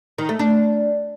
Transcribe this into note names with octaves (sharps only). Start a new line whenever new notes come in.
D#3
A3
D4